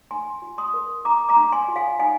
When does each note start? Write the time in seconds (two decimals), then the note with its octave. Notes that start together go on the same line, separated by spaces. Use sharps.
0.11 D4 G#5 C6
0.42 F4
0.58 C6 D#6
0.74 A#4
1.05 D4 A#5 D6
1.29 A#5 D6
1.37 D4
1.52 G#5 C6
1.68 F4
1.76 F5 G#5
1.99 D#4 F5 G#5